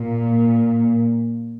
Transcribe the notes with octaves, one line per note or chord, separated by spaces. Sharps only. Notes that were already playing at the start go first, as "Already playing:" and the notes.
Already playing: A#2